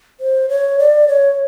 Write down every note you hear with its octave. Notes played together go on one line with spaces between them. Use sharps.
C5
C#5
D5
C#5